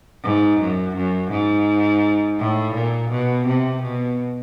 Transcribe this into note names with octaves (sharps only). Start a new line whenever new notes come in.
G#2
F#2
F#2
G#2
A2
A#2
B2
C3
B2